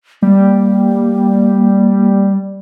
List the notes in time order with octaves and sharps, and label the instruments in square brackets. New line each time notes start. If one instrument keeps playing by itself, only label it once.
[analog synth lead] G3 [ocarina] A#3